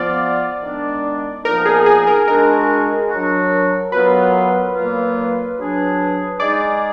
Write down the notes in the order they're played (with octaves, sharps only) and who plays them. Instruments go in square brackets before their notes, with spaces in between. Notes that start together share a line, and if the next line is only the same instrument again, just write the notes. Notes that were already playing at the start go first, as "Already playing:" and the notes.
Already playing: [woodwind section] F3 B3 F4 [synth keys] D5
[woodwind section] D#3 G#3 B3 D4
[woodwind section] A#2 F3 B3 D#4 [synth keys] A#4
[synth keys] G#4
G#4
A#4
[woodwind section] G#3 D4 F#4 [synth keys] A#4
[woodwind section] F#3 D4 F#4
[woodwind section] F#3 B3 F4 [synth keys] B4
[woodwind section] A#2 F#3 A#3 F4
F#3 D4 G#4
[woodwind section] G#3 D#4 G#4 [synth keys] D5